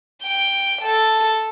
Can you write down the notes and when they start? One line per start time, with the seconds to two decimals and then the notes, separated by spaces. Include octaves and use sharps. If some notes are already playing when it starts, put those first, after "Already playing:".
0.23 G5
0.81 A4